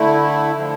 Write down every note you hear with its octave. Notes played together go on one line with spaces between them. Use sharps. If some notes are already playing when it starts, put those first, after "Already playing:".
Already playing: D3 A3 E4
D3 F3